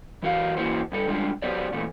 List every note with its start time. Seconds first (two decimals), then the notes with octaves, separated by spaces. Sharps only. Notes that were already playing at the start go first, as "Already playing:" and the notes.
0.22 E3 F#3 F#4 A#4 D#5 F5
0.57 E3 A#3 C4 E4 F#4 C5
0.92 G2 G3 A4
1.08 G3 G#3 D4 F4
1.42 F#3 B3 G4 C5 D5
1.72 A#2 E3 A3